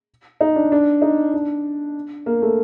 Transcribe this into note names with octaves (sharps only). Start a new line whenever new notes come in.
D#4
D4
D4
D#4
D4
A#3
A3